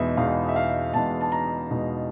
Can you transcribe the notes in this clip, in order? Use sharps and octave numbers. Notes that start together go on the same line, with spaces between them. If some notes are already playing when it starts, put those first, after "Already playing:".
Already playing: E2 B2 G#3 B3 D#4 E5
E2 B2 G#3 B3 D#4 F5
E5
F5
E2 B2 G#3 B3 D#4 A5
A5
A#5
E2 B2 G#3 B3 D#4